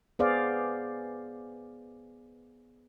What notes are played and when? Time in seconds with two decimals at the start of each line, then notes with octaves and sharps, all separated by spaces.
0.19 B3 G#4 C5 D5 F5